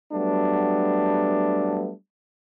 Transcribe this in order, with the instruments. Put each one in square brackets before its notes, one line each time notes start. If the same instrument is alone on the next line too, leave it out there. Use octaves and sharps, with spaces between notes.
[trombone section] F#3 G3 A3 B3 D4